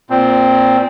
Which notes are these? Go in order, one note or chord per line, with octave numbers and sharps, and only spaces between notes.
A#2 C4